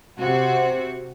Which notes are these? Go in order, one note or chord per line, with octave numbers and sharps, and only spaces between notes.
C3 C4 F#4